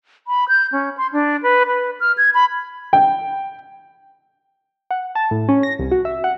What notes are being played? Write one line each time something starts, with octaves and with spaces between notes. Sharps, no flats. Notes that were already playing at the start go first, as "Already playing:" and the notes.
B5
G6
C#4
C6
D4
B4
B4
F6
G#6
B5
G5
F#5
A5
A2
C#4
A#6
C2
F#4
E5
F#5